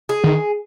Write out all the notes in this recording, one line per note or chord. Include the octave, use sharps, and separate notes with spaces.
G#4
D#3